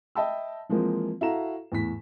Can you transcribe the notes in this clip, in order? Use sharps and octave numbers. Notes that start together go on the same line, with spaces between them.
D#5 E5 G5 A5 B5 E6
E3 F3 G#3 A#3 C4
E4 F#4 A4 F5 A#5 E7
E2 A2 B6